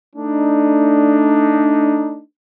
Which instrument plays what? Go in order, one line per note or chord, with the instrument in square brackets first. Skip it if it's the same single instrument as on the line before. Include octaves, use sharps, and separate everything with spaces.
[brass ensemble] A3 D4 D#4